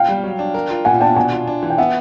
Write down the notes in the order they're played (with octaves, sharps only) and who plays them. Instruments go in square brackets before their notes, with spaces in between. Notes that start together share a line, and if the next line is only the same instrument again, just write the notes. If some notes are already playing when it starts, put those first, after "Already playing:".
Already playing: [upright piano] F5 G5
[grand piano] G3
F#3
D4
A#4
F4
[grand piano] A#2 [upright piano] F#5 G#5
[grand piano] D4 [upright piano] G5 A5
[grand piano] B2 [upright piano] F#5 G#5
[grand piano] F4
D4
E3
[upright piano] G5
[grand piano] B3 [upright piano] E5 F#5